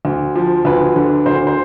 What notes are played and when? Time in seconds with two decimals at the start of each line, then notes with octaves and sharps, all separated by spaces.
0.05 D2
0.35 F3
0.65 D2 B4
0.96 D3
1.26 D2 C5
1.47 C5